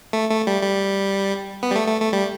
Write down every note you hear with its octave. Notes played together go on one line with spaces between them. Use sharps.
A3
A3
G3
G3
B3
G3
A3
A3
A3
G3